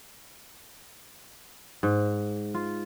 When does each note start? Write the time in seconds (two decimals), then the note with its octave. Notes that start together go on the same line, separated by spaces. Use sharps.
1.83 G#2
2.54 F4